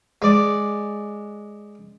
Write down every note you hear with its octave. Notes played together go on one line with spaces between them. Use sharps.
G#3 D5